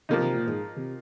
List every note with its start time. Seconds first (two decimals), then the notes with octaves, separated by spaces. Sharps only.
0.09 C3 F3 A#3 D#4
0.21 C3
0.35 A#2
0.47 G#2
0.76 C3